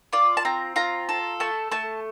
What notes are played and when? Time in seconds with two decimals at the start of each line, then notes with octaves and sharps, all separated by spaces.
0.13 F4 D5
0.37 A5
0.45 C4 A#5
0.76 F4 A#5
1.09 A4
1.40 A3 A5
1.71 A3 A5